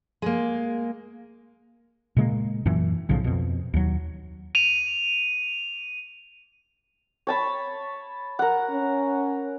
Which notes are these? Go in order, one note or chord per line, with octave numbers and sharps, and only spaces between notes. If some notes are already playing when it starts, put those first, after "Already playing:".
G#3 A#3
A#2 C#3 G#3 A#3
F#2 A#2 E3
B1 A2 C#3 F3
F2 B2
D#2 F#3
D#7 F7
C#5 A5 B5
A#4 F#5
C#4